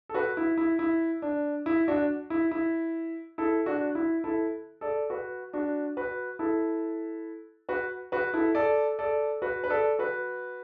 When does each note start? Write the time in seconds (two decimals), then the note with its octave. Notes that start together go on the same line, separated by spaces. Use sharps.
0.09 A4
0.14 F#4 B4
0.37 E4
0.58 E4
0.79 E4
1.22 D4
1.66 E4
1.88 D4 F#4
2.30 E4
2.52 E4
3.38 E4 A4
3.66 D4 F#4
3.95 E4
4.24 E4 A4
4.81 A4 D5
5.10 F#4 B4
5.53 D4 F#4
5.97 F#4 B4
6.39 E4 A4
7.69 F#4 B4
8.12 F#4 B4
8.34 E4 A4
8.55 A4 D5
8.99 A4 D5
9.42 F#4 B4
9.64 B4
9.70 A4 D5
9.99 F#4 B4